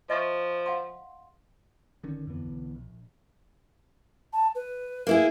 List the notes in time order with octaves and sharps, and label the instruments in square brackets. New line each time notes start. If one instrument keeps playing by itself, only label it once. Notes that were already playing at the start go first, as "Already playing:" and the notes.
[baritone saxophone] F3 [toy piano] D#5 E5 C#6
[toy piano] F5 F#5 C6
[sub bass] D#1 [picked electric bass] D3 D#3 C#4
[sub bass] F2 [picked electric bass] D3 E3 B3
[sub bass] B1
[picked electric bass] A#1
[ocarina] A5
B4
[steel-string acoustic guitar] A#3 E4 G#4